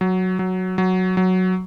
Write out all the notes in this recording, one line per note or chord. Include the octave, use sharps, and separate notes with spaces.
F#3
F#3
F#3
F#3